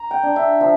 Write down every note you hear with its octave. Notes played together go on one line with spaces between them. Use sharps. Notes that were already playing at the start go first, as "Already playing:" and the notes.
Already playing: A#5
G5
D4
E5
F3 E5